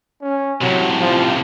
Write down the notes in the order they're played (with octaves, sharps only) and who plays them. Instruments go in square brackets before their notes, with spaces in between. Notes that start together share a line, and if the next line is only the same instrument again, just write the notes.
[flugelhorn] C#4
[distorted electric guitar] A2 C3 [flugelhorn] F#3
[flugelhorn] F3